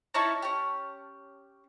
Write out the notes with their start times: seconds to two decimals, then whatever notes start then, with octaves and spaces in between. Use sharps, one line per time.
0.14 C#4 D#4 E4 A5 C#6
0.42 C#4 G4